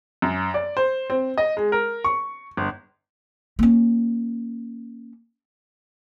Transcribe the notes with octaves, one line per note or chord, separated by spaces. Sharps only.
F#2
D5
C5
C4
D#5
G#3
A#4
C#6
G1
A#3 C#4